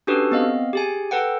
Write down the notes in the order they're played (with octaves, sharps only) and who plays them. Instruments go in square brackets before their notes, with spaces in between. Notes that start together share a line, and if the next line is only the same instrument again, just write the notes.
[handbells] C#4 D4 F#4 G4 A4 B4
B3 C4 D#5 F5
G4 G#4 G#5
A4 B4 F#5 G5